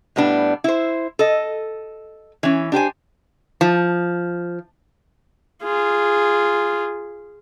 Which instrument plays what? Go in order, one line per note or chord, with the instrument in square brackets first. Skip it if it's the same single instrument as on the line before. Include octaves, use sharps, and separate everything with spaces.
[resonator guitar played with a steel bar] A2 G3 B3 D4
E4 C5
A4 D#5
E3 C#4
D4 G4 C5 G#5
F3
[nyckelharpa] F4 G#4